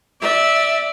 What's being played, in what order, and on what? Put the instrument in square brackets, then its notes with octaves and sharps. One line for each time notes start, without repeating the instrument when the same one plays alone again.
[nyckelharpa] D5 [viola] E5